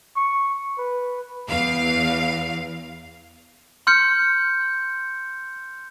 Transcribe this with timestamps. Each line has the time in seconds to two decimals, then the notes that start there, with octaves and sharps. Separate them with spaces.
0.16 C#6
0.78 B4
1.47 E2 F5
3.87 C6 F6 G6 C#7